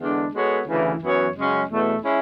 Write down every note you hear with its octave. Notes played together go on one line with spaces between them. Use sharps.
E2 D3 G#3 D4
G#3 B3 F#4 A4 C#5
D2 C#3 E3
F#2 E3 B3 F#4 C#5
F#2 C#3 G#3 C#4
E2 B2 A3
G#3 C#4 E4